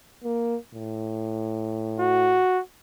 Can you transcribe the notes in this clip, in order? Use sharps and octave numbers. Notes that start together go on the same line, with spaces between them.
A#3
A2
F#4